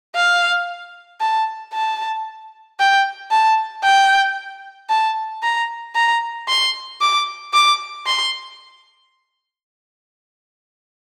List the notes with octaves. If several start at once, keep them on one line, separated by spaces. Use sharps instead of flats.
F5
A5
A5
G5
A5
G5
A5
A#5
A#5
C6
D6
D6
C6